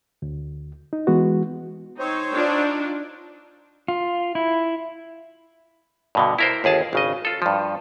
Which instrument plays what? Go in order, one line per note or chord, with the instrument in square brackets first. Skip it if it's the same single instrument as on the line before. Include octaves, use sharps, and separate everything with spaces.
[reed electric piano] D2
D#4
E3 G#3 B3 F#4
[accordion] C4 C5 C#5 [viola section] D#4
[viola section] D4 D#4 F4
[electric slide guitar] F4
E4
[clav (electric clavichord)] G2 B2 D3
E4 A#4 C5
G1 D#2 G#4 A5
G#1 C#3 D#5
F4 A4
G2 F3